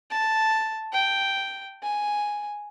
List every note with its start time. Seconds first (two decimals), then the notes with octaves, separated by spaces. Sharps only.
0.10 A5
0.92 G5
1.82 G#5